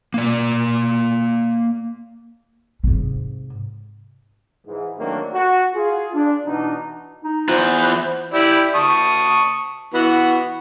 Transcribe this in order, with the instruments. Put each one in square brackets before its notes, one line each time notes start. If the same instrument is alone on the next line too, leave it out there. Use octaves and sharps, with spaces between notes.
[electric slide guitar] A#3 D5
[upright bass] G#2 C3
[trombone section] G#2 E3
D#3 F#3 A3 A#3 C4 D4
F#4
F4 G#4
D4
B2 E3 D4 D#4
[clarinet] D#4
[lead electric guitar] E2 B4 [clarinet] F4 [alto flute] C5
[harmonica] E4 G4 D5
A5 C#6 D#6
E3 B3 F#4